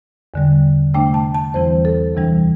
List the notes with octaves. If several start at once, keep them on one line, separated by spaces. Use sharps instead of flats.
E2 D3 G3
C3 A3 D4 G5
A5
A5
E2 E3 G3 C4 E4 C5
A4
D2 C3 E3 G3 D4